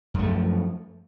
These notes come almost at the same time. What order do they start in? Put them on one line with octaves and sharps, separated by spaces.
F#2 A3 F3